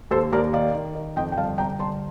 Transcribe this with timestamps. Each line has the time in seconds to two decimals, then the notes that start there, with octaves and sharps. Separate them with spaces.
0.11 D#2 A4 C5
0.32 D#2 A#4 D5
0.53 D#3 D5 F5
0.74 D#3
0.95 D#3
1.16 F2 D#5 G5
1.32 G5
1.37 G1 F5 A5
1.58 G1 G5 A#5
1.79 G1 A5 C6